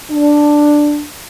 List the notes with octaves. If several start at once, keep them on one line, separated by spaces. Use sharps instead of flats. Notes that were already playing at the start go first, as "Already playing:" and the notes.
D4